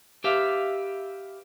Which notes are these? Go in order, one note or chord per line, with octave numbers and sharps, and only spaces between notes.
G4 B4 E5 F5